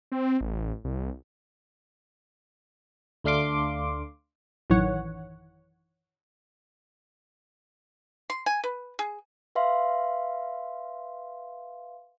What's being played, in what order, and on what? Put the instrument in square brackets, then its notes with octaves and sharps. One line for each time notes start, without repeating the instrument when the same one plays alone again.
[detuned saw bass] C4
A1
C2
[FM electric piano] D2 A3 D4 F5 C6 D6
[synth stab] A1 F#2 D#3 E3 C#5 F#5
[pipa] C6
G#5
B4
G#4
[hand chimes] B4 E5 F5 C6